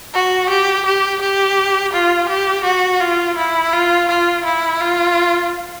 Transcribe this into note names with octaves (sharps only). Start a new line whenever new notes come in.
F#4
G4
G4
G4
F4
G4
F#4
F4
E4
F4
F4
E4
F4